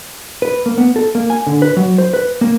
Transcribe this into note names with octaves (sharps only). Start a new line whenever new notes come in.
B4
A#3
B3
A4
A#3
G#5
D3
B4
F#3
C5
B4
A#3